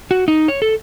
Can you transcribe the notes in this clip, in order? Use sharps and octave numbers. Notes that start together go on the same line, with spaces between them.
F#4
D#4
C#5
A4